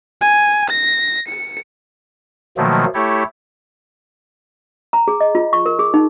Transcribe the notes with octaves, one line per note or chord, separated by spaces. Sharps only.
G#5
A#6
C#7
B2 D#3 F3 F#3 A3 A#3
A3 E4 G4 A4 C#5
A#5
G#4
D#5
F4
C#6
A#4
G#4
D#4